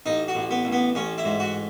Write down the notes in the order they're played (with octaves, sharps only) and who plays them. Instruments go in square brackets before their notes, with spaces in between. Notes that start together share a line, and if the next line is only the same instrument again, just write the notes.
[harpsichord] A1 D#4
F#4
A1
B3
A1
B3
A1 C#4
E4
G#2
F#4